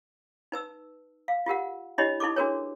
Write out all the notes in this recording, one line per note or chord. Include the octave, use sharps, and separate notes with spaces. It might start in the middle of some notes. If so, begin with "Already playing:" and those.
D#4 B4 E6
F5
F4 G4 A#4 F#5
D4 E4 G4 C#5 D#5 B5
D#4 E4 A4 C#6 D6
D4 F#4 G#4 A#4 B4 C#5